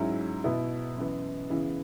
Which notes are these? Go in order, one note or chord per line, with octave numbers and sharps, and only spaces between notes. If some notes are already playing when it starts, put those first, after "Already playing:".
Already playing: G#2 F#3 C#4 E4
B2 B3 E4
F#2 E3 B3
C#3 E3 B3 E4